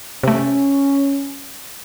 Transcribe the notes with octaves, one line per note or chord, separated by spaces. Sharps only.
C3 A3 C#4